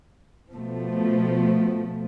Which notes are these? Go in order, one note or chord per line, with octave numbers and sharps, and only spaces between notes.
B2 F3 A3